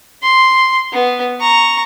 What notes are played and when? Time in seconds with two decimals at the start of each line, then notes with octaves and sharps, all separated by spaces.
0.22 C6
0.93 B3
1.40 A#5 C#6